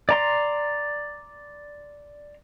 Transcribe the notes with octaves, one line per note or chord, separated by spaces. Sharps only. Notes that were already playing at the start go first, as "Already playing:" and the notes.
D5 A#5 C6